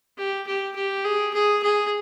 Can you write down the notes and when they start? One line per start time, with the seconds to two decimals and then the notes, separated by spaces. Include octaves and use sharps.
0.17 G4
0.46 G4
0.75 G4
1.05 G#4
1.34 G#4
1.63 G#4